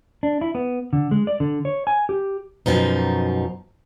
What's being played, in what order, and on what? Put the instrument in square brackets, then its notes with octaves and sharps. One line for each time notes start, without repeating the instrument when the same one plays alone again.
[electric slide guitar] D4
E4
B3
D3
G#3
D5
D3
C#5
G#5
G4
[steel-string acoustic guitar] F#2 B2 F3 D#4